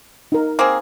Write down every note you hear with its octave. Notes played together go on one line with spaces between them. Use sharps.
D#4 A#4
A#3 C4 G#4